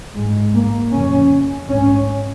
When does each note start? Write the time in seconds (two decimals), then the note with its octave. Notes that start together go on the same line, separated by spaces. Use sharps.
0.15 G#2 G#3
0.54 A#3
0.92 F2 C#3 C#4
1.69 G#2 C#4